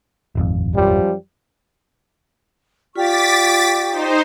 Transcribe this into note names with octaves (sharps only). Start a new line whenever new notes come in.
D#1 G#1 F2
F#2 F3 G3
F4 G4 D5 F5 C#6 D6 A6 B6
D#4 C5